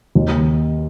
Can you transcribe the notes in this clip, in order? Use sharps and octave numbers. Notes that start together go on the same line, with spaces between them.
D#2